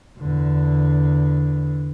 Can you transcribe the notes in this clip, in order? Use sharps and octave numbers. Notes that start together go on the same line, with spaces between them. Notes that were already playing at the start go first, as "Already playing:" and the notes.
E2 D3